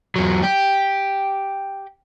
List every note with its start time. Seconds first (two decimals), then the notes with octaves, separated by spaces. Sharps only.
0.16 E2 F#3
0.44 G4